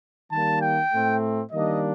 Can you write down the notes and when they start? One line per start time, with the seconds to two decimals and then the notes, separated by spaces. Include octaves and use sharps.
0.31 D#3 G3 A#3 A5
0.61 G5
0.92 A2 A3 C4
1.52 D#3 G3 A#3 D4 D#5